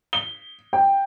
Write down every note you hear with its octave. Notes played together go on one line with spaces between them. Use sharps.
G7
G5